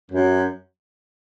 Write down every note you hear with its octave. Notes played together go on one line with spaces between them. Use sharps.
F#2